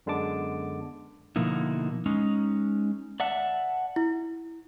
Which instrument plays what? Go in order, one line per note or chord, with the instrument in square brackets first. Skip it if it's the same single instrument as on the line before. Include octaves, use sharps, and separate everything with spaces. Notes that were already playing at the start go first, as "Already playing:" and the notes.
[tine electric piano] F#2 D3 G#3 B3 A5 D6
[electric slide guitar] B2 D3 F3 A#3 D#4 E4
G#3 C#4 D#4
D5 E5 F#5 A5
[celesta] E4